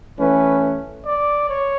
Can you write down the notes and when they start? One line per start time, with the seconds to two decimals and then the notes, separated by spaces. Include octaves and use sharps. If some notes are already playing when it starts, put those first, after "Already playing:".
0.18 E3 A3 C#4 B4
1.05 D5
1.49 C#5